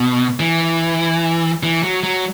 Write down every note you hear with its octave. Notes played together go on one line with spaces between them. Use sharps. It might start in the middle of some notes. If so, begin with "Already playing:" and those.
Already playing: B2
E3
E3
F#3
F#3